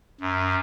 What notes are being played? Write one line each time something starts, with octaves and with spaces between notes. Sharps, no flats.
F#2